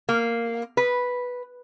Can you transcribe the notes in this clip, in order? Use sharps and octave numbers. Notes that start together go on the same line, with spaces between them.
A#3
B4